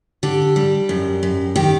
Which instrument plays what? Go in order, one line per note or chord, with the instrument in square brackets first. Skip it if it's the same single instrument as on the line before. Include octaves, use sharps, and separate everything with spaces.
[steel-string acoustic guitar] D3 G4
G3
F#2
F#2
D#3 G4